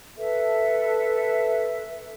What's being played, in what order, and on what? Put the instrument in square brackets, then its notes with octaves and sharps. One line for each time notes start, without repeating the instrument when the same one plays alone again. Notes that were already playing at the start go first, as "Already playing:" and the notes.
[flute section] A4 B4 E5